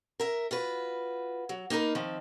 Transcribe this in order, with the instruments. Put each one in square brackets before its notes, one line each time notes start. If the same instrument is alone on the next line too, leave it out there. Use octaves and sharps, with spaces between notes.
[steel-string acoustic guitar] A#4 E5
F4 F#4 B4
F#3
A#3 D#4 G4 A#4 B4
D#3 F3 C4